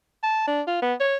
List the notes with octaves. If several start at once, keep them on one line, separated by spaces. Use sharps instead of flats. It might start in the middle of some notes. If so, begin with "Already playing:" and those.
A5
D4
F4
B3
C#5